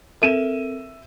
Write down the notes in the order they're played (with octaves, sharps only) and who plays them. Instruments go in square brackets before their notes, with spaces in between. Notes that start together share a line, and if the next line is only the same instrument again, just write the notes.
[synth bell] C4 A4 A#4 [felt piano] E5 D#7 E7